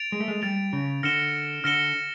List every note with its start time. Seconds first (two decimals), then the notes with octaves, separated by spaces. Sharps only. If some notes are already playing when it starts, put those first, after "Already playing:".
Already playing: A6 D7 F7
0.12 G#3
0.20 A3
0.28 G#3
0.42 G3 A6 D7 F7
0.73 C#3
1.03 D3 F6 A#6 C#7 E7 G7
1.64 D3 F6 A#6 C#7 E7 G7